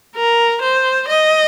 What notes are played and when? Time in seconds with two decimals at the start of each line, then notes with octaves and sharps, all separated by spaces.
0.15 A#4
0.61 C5
1.08 D#5